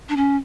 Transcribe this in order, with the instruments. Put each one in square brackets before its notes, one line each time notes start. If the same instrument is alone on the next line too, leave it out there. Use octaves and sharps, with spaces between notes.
[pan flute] D4
C#4